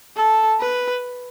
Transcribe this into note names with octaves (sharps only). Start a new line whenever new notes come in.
A4
B4